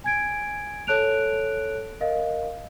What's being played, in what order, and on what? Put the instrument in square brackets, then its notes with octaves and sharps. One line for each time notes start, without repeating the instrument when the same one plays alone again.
[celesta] G#5 G#6 D7
A4 C#5 A5 F#6 D7 F7
A#4 D#5 F5